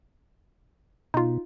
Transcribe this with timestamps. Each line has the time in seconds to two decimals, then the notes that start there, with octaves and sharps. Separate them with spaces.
1.14 B2 D#4 F4